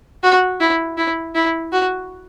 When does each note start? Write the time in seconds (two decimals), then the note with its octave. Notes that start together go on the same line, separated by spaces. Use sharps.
0.23 F#4
0.60 E4
0.97 E4
1.35 E4
1.72 F#4